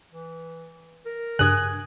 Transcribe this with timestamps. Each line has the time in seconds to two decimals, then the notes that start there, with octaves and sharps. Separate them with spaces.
0.12 E3
1.06 A#4
1.39 G2 C#3 G#5 D#6 F#6 G#6